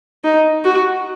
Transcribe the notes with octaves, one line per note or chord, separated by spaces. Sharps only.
D#4
F#4